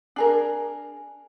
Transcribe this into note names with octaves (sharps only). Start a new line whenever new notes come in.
D4 G#4 A#4